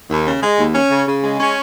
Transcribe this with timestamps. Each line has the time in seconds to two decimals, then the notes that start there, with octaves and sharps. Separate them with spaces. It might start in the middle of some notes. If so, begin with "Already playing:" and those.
0.10 D#2
0.25 C#3
0.43 G#3
0.58 D#2
0.75 C#4
0.91 C#3
1.07 C#3
1.23 G#3
1.40 C#4